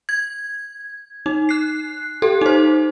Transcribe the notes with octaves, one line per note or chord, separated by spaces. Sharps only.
G#6
D#4
F#6 C7
G4 A4
D#4 C5